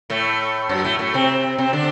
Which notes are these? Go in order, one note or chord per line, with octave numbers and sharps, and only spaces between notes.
A2 A3
F#2 F#3
A2 A3
A2 A3
C3 C4
C3 C4
D3 D4